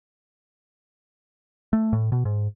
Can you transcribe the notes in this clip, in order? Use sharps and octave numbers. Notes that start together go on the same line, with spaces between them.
A3
A2
B2
G#2